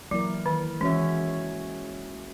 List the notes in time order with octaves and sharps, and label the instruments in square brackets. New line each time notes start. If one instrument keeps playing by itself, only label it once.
[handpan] E3 A#3 E4 A#4 [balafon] F#3
[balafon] D#3
[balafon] E3 [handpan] G#3 C#4 F#4 C#5 E5